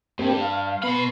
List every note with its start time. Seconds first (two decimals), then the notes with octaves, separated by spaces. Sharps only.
0.19 G2 A#3 C4 G4
0.41 F5
0.83 B2 B3 B5 C6